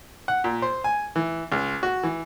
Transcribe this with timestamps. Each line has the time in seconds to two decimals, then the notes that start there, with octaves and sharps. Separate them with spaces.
0.28 F#5
0.44 A#2
0.62 C5
0.84 G#5
1.16 E3
1.52 C#2
1.83 F#4
2.03 E3